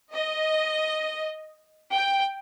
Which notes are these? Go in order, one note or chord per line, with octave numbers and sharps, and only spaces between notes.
D#5
G5